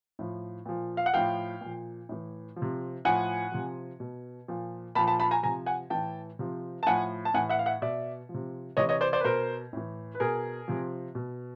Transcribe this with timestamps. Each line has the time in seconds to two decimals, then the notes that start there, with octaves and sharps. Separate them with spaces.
0.19 A2 F3
0.66 A#2 F3
0.97 F5
1.06 F#5
1.14 A2 F3 F5 G5
1.61 A#2
1.66 F3
2.09 A2 E3
2.56 F3
2.62 C3
3.05 A2 F3 F#5 G#5
3.52 C3 F3
4.00 B2
4.48 A#2 F3
4.95 A#2 F3 A5 B5
5.07 A5 B5
5.20 A5 B5
5.31 G#5 A#5
5.43 C3 F3 G#5 A#5
5.66 F#5 G#5
5.90 A2 E3 G5 A5
6.39 C3 F3
6.83 A5
6.86 A2 F3 F#5 G#5
7.25 A5
7.34 A2 E3 F#5 G#5
7.49 E5 F#5
7.59 F5
7.66 E5 F#5
7.82 B2 D5 E5
8.29 F3
8.34 C3
8.77 C3 E3 C#5 D#5
8.89 C#5 D#5
9.01 C5 D5
9.13 C5 D5
9.21 B4
9.24 B2 A#4 C5
9.73 A2 E3
10.15 B4
10.20 B2 G#4 A#4
10.68 C3 F3
11.15 B2